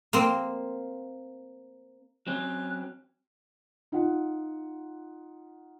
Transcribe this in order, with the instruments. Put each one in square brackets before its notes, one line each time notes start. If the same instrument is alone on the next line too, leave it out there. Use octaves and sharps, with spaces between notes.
[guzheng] A#3 C4
[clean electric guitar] F#3 C4 C#4 [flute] F#6
[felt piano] D#4 F4 F#5